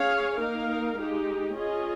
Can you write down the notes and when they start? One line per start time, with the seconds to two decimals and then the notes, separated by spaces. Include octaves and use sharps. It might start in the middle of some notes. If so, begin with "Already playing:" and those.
Already playing: C#4 G#4 C#5 F5
0.39 A#3 D#4 A#4 F5
0.97 G#3 D#4 G4
1.54 C#4 F4 G#4 D#5